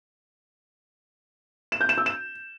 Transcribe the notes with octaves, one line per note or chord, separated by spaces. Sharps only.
E7
G6
E7
E6
E7